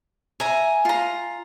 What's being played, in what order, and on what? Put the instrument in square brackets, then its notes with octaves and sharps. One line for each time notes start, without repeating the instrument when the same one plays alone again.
[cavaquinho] E5 A#5 [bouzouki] G#5
[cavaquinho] F4 A#5